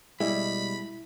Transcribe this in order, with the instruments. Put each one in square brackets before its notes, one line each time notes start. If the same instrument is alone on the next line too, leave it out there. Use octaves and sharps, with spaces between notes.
[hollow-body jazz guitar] B2 G3 G#3 [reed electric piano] E4 [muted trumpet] B5